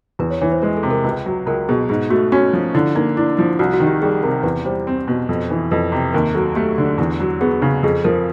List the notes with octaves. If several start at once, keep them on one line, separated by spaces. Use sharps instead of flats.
E2 B4
C#5
E3 C#5
C5
G#3 B4
A4
C3
A#4
C#2 B4
F#3
C#2 A#4
B2 G#4
G#2 G#4
A3 F#4
C#4 F#4
F3
D3 E4
A#3 D#4
D4 E4
F3 E4
C2 F#4
F#4
D#3
G4
G3 G#4
C3 A#4
E2 B4
G3 C5
C4
B2
F2
E3
F2 B4
C3
D#2 A#4
F#3 A4
A3 G4
D3
E2
F#3
B3 G#4
C#3
F2 G#4
F3 A#4